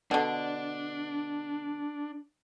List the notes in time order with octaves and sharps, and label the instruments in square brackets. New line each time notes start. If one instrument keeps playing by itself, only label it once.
[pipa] B2 D3 [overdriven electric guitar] D4